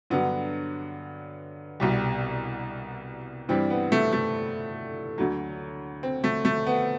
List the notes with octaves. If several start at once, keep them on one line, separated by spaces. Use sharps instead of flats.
G2 D3 F#3 B3
C2 B2 G3
G2 E3 G3 C4
B3
A3
A3
D2 D3 F#3
C4
A3
A3
B3